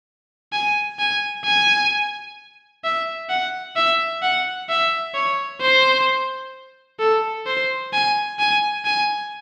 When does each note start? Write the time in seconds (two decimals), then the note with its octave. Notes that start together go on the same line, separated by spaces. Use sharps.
0.53 G#5
0.99 G#5
1.45 G#5
2.84 E5
3.29 F#5
3.76 E5
4.23 F#5
4.69 E5
5.14 C#5
5.61 C5
6.99 A4
7.47 C5
7.93 G#5
8.39 G#5
8.85 G#5